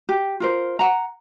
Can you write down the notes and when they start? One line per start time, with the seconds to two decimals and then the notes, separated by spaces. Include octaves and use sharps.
0.09 G4
0.40 F4 A#4 C5
0.79 F#5 A#5